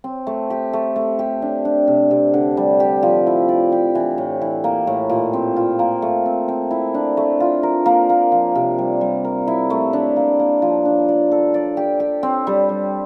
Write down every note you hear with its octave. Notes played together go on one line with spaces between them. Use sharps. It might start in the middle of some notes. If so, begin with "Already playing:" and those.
C4
A3
G4
A3
A3
G4
D4
D4
C3
C3
D3
G3
G4
F3
E4
D5
G4
E3
A2
E3
A#3
A2
A#2
C4
F4
A#3
A3
C4
C4
E4
D4
A3
F4
A#4
A#3
A#3
F3
C3
G3
G3
A#4
E4
A3
D4
A#3
A#3
F3
D4
D5
A4
D5
G4
G4
C4
G3
G3